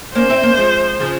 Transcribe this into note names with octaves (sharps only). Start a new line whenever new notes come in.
A#3 C#4 C5
C4 E4
A#3 C#4
F3 G#3
C#3 F3